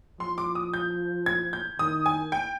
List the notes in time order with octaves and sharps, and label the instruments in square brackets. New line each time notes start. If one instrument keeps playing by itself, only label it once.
[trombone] F3 [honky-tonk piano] C6
[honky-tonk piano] D6
D#6
G6
G#6
G6
[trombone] D#3 [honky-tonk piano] D#6
[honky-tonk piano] G#5
G5